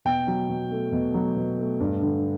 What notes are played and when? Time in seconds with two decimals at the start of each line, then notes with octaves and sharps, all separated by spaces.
0.05 B2 G5
0.27 F#3
0.49 B2
0.71 A3
0.92 B2
1.14 F#3
1.36 B2
1.59 A3
1.80 G2
2.02 D3